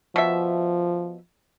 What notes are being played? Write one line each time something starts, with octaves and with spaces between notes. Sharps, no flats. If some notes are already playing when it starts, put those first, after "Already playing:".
B2 F3 E5